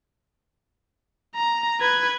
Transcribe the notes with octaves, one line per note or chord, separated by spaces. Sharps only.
A#5
B4 G#6